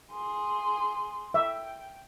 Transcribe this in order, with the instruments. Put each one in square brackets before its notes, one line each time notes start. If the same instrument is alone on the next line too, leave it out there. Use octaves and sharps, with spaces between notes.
[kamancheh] G#4 C6
[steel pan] E5 [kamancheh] G5